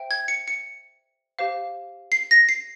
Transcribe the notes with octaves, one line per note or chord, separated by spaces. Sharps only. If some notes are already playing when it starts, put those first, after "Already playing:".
Already playing: C5 E5 G5
G#6
C#7
C#7
G4 C5 F5
C7
A#6
C7